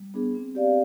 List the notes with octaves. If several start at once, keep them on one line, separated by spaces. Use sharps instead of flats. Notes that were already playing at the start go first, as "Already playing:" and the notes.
Already playing: G3
B3 D4 G#4
C4
G4 D5 F5